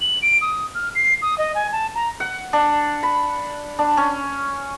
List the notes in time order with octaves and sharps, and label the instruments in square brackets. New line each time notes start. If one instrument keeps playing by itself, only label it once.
[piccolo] F#7
D7
D#6
F6
C7
D#6
D#5
G#5
A5
A#5
[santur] F#5
D4
B5
D4
C#4